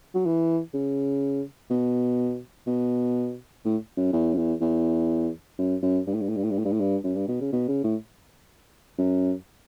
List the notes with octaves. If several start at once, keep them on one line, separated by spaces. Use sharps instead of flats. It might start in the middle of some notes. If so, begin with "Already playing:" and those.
F#3
E3
C#3
B2
B2
A2
F#2
E2
F#2
E2
E2
F#2
F#2
G2
A2
G2
A2
G2
A2
G2
A2
G2
A2
G2
F#2
G2
B2
C#3
B2
C#3
A2
F#2